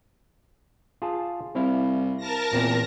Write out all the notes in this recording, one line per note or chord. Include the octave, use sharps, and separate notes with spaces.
F4 G#4 A5
C2 C4 E4 F5
A#4 A5 A#6
E2 A#2 C4